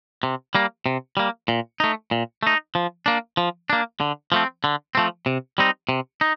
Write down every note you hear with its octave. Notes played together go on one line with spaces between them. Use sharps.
C3
G3 A#3
C3
G3 A#3
A#2
A3 D#4
A#2
A3 D#4
F3
A#3 D4
F3
A#3 D4
D3
F3 A3 C4
D3
F3 A3 C4
C3
G3 C4 D#4
C3
D#4